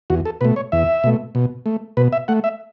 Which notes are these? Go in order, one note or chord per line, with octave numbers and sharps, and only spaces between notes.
E2 F#4
A4
B2 A3 B4
C#5
E2 E5
B2 A3
B2
A3
B2 B4
E5
A3 F#5
E5